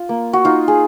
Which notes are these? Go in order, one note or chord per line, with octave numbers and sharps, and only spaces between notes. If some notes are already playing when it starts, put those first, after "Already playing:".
Already playing: F4
A#3
F#4
D#4 F4
G#4